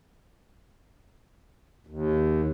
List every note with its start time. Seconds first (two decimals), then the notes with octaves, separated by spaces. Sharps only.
1.87 D#2